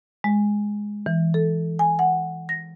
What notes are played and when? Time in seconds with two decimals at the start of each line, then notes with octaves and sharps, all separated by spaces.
0.24 G#3
1.06 E3
1.34 A4
1.79 G#5
1.99 F#5
2.49 A#6